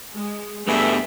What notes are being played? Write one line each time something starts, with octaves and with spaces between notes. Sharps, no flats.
G#3
G2 A3 B3 G#4 E5